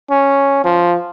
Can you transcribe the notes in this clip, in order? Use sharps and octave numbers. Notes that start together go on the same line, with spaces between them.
C#4
F3